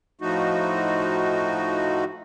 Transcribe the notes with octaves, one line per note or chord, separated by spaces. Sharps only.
A2 F3 A3 D#4 F#4